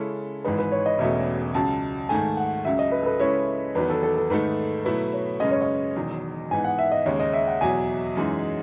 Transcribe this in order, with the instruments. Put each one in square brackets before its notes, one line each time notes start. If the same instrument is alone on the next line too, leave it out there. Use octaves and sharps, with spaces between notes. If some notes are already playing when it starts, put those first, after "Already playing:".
Already playing: [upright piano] C#3 G#3 C#4 E4 A4
[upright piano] G#1 G#2 E3 G#3 D#4 [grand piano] B4
[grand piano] B4
C#5
D#5
[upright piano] E1 E2 B2 A3 C#4 [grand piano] E5
[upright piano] C#2 C#3 F#3 [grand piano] A5
[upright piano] G#2 D#3 A3 [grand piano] G#5
[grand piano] F#5
[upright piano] C#2 C#3 F#3 [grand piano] E5
[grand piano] D#5
B4
A4
B4
[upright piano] C#3 G#3 C#4 E4 [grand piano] C#5
[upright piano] E2 D#3 F#3 B3 [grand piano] B4
[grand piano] A4
A4
A4
[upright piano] G#2 D#3 A3 D#4 A4 [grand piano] B4
[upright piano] B2 F#3 A3 E4 [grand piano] B4
[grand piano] C#5
[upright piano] F#2 C#3 G#3 C#4 [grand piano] D#5
[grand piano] C#5
D#5
[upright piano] E1 E2 D#3 F#3
[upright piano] G#2 E3 B3 D#4 [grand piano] G#5
[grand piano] F#5
E5
D#5
[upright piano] D#2 C#3 G#3 [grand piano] C#5
[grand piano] D#5
E5
F#5
[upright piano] E2 B2 F#3 [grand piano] G#5
[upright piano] F#2 E3 G#3 D#4 G#4